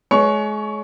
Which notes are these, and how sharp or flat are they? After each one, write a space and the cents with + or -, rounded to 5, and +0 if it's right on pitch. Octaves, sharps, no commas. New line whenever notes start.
G#3 +35 C#5 +30 C#6 +0